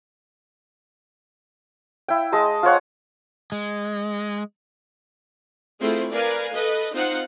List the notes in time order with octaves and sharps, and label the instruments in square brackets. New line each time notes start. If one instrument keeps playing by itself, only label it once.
[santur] E4 G5
G#3 D#5 A5 C6
F4 C5 C#5 F#5
[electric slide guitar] G#3
[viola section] A3 C4 E4 F4 G#4 C5
A#4 B4 D5 F5 G#5
A4 B4 D#5
C4 D#4 F4 C5 F5 F#5